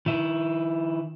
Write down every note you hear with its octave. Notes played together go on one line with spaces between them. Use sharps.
D#3 E4